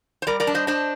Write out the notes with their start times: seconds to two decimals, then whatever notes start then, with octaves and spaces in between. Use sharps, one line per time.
0.22 C5
0.27 G3 A#4 D5
0.40 A#4 D5
0.47 D4
0.54 C5 D#5
0.67 D4 C5 D#5